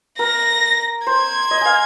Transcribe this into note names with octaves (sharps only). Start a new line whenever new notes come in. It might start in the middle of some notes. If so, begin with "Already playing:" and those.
A#4 A#6
C5 G#6
D#5
F5 G#5